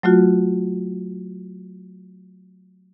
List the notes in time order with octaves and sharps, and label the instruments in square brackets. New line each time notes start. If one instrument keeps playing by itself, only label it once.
[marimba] F#3 A3 F4 F#4